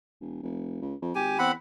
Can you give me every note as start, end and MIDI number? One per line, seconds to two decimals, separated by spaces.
0.20 0.39 28
0.42 0.77 29
0.81 0.94 37
1.02 1.13 41
1.15 1.38 32
1.15 1.38 67
1.15 1.38 80
1.39 1.53 40
1.39 1.52 60
1.39 1.52 78
1.39 1.52 83